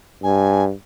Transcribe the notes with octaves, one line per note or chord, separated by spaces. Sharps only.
G2 G#5